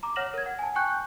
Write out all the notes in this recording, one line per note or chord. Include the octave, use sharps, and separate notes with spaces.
A#5 D6
C#5 F#5 F6 A#6 E7 F#7
A#4 G#6
F#5
G#5 A5
G5 G#5 C#6 F#6 G6